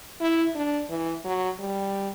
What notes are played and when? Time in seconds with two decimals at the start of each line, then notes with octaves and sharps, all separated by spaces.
0.21 E4
0.55 D4
0.90 E3
1.25 F#3
1.60 G3